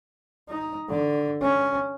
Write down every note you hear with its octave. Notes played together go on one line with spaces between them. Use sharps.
D#4
D3
C#4